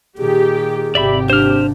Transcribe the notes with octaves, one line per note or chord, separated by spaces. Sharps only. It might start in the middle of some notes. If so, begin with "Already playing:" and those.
A#2 D#3 G4 G#4
G#1 C3 G4 D5 E5 B5
D4 C5 F6